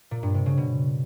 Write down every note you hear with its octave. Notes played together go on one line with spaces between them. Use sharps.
A#2
G2
C3
C#3
B2